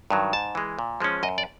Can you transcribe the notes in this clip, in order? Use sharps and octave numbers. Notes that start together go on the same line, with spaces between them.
G2 D#3 F#3
G#2 A5
E3 G#3
A#2
F3 G#3 C#4
F#2 D#5
D5